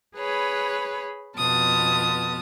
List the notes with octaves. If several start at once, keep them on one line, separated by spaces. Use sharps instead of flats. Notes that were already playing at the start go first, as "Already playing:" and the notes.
G#4 B4 C#5 B5
F2 B2 B3 F4 A5 D#6